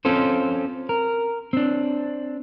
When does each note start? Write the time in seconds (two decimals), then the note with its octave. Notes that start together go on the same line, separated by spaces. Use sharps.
0.05 C4 C#4 F4 A4 C5
0.89 A#4
1.53 C4 D4